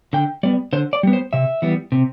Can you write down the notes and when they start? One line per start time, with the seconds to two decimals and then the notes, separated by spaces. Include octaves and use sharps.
0.13 D3 G5
0.43 G3 B3 D5
0.73 D3 C5
0.93 D5
1.03 G3 B3
1.13 C5
1.33 C3 E5
1.62 E3 G3 B3
1.92 C3